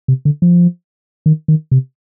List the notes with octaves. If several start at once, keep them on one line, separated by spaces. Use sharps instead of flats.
C3
D3
F3
D#3
D#3
C3